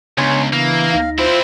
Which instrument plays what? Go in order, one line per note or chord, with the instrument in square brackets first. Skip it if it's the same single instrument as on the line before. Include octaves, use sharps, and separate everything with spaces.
[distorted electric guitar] C#2 [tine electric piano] C#3 B3 D4 [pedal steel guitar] C#5 G#5 C6
[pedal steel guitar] E3 [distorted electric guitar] A#3
[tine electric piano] D2 D#4 A#6 [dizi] F5
[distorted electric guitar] C4 E4 [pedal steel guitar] F4 [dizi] C5